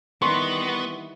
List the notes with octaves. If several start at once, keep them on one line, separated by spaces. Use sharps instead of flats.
D#3 E3 G3 B3 C6 C#6